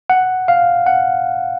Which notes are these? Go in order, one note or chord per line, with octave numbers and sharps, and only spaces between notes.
F#5
F5
F#5